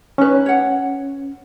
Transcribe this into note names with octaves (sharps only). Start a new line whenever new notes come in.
C#4 D#4 B4
C#5 F#5